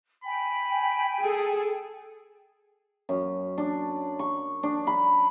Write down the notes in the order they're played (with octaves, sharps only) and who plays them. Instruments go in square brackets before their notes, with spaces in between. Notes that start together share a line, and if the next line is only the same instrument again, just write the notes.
[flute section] G5 G#5 [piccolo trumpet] B5
[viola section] G#4 A4
[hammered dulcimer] F#2
D4
C#6
D4
B5